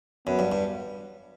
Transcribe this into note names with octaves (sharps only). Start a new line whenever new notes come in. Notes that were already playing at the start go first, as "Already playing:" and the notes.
F#2 B3
G2
G2